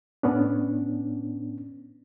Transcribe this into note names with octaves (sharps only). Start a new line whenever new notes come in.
A2 B3 C#4 D4